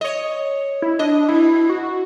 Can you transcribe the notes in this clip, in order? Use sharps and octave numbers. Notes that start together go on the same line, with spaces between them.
C#5 D#5
E4
D4 D#5
B2 E4
F#4